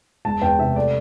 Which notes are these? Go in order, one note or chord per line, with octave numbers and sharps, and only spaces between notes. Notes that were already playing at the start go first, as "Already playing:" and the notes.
E1 A5
E2 G5
C3 E5
A3 D5